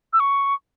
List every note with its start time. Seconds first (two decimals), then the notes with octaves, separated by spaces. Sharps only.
0.13 E6
0.20 C#6